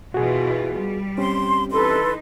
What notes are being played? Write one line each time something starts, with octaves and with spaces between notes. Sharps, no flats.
B2 E3 F4 F#4 G#4
G3
C4 C#4 G4 C6
E3 D#4 A4 B4 C6